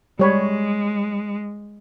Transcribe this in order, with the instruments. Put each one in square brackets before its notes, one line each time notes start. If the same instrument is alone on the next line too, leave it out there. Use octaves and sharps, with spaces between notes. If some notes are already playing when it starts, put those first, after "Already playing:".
[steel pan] G3 C#5 B5 [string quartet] G#3